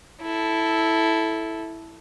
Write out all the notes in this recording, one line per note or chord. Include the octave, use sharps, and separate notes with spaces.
E4 A4